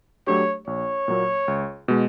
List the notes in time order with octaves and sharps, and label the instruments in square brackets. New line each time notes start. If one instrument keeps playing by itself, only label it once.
[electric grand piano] F#3 A3 D4 G4 [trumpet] C#5
[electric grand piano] A#1 [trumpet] C#5
[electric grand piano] A#2 F#3 A#3
C#2
B2 G#3